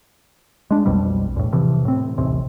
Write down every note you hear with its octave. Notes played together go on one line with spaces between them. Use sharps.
G#3 D4
B1 F2 B2 G3
E2 A2
C3 E3 F3
A2 C4
A1 D#2 C3